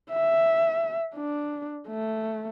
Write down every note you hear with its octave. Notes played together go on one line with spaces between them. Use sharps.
E5
D4
A3